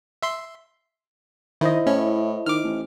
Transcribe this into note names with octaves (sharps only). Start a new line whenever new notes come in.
E5 C6
D#3 E4 C5 D#5
A2 C#4
D#3 D6 F6
A1